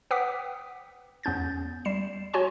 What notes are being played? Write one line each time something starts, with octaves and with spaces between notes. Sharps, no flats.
B4 F#5 G5 D6 D#6 B6
E2 B3 C#4 G6 A6
G3 C7 E7
F#4 C#5 G#5 C6